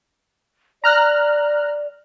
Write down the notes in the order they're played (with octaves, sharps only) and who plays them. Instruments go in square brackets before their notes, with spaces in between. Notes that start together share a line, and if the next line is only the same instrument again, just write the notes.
[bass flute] D5 [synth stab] A#5 F6 F#6